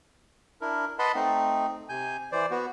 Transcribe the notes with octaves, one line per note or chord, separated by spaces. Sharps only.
D4 E4 A#4
B4 D#5 F#5 A5 B5 C6
A3 C4 D#4
C3 G#5 G6
E3 C5 D5
B3 F#4